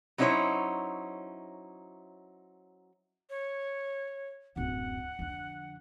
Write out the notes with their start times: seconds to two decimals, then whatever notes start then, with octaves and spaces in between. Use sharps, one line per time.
0.18 F#3 C#4 D#4 E4 C5 C#5
3.30 C#5
4.56 D1 F#2 F#5
5.19 F2 D3